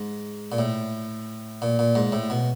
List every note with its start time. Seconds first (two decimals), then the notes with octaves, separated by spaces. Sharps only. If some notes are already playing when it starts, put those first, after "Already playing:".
Already playing: G#2
0.52 A#2
0.59 A2
1.62 A#2
1.79 A#2
1.95 G#2
2.12 A2
2.30 B2